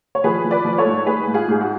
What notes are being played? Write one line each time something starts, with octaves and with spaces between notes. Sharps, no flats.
C#5
F3 G#4 B4
F3
B4 D5
F3
A4 C#5
G#2
G#2 G#4 B4
G#2
F4 G#4
G#2 G#4
F#4